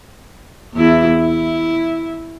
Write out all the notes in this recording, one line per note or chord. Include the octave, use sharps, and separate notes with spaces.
E2 E4
E4